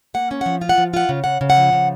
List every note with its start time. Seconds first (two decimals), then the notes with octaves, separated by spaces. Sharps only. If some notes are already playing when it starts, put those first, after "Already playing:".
0.14 A#3 F#5
0.31 C#4
0.41 F3 F#5
0.62 F4
0.69 F#5
0.78 F3
0.94 F4 F#5
1.09 C#3
1.24 C#3 F#5
1.41 C#3
1.50 F#5
1.57 F3
1.73 C#3